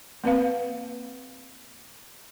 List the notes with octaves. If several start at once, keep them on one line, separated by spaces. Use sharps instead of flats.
A#3 C4 B4 F5